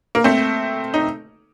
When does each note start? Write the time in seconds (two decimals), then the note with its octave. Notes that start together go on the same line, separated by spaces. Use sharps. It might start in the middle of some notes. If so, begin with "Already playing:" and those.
0.15 A#3
0.24 A3 C4
0.94 D#4